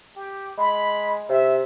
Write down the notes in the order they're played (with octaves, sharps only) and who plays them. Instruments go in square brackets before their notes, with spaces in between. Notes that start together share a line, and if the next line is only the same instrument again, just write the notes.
[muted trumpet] G4
[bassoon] G#3 [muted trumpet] B5
[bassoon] C3 [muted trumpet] E5